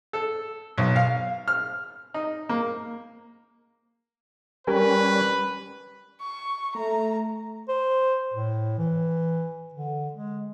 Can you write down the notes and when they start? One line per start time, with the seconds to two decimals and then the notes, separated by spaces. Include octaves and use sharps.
0.13 A4
0.78 B1
0.96 F5
1.48 F6
2.14 D#4
2.49 A#3
4.67 G3 C#4 G4 A#4 B4 G#5
6.20 C#6
6.76 A3 A#5
7.69 C5
8.34 A2
8.78 E3
9.74 D3
10.13 G#3